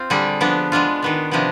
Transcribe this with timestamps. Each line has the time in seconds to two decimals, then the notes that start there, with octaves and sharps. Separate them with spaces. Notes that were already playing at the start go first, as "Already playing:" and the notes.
Already playing: C4 F4
0.10 D3 G3 D4 G#4
0.40 F3 B3 D4
0.72 G#3 B3 D4 F4
1.02 D#3 B3 D4
1.31 C3 F3 B3 D4